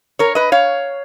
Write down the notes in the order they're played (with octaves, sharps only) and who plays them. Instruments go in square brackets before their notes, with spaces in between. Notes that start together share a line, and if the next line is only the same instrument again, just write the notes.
[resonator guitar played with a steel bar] A#4 C#5
B4 D#5
C#5 F5